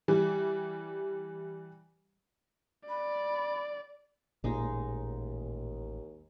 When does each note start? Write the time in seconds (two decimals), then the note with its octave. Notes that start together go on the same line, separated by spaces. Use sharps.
0.08 E3 G3
2.89 D5 B5
4.44 A1 D#2 A#2 G#3 D#4